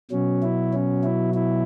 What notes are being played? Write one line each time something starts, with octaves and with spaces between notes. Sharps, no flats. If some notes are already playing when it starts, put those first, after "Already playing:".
B2 F#3 C#4
E4
C#4
E4
E4